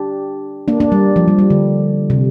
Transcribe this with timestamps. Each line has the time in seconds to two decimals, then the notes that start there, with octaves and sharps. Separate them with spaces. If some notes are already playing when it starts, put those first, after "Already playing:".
Already playing: D4 G4
0.68 A#3 D4
0.80 A#3 D4
0.92 G3
1.16 F3
1.28 G3
1.39 G3
1.50 D3
2.10 C3